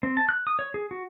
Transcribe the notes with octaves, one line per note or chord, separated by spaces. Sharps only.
C4
A5
F#6
D#6
C#5
G#4
F#4